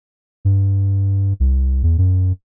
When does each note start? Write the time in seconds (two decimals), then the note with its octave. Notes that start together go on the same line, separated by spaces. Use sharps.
0.45 G2
1.40 C2
1.83 E2
1.98 F#2